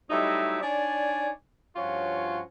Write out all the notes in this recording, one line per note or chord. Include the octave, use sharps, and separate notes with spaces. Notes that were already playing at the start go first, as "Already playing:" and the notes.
F#3 G3 A3 D#4 E4 D#5
D4 D#4 C#5 D5 G#5
G2 F3 C#4 F4 F#4 C#5